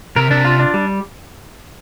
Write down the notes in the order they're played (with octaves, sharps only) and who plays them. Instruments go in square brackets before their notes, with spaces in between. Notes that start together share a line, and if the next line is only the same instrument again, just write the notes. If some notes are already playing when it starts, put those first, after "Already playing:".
[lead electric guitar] C3 [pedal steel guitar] A#4
[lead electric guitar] C3 [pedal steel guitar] D4
[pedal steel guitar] F4
D4
G3